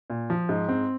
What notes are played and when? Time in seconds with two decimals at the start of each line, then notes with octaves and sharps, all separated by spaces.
0.10 A#2
0.30 F3
0.49 G#2
0.68 C4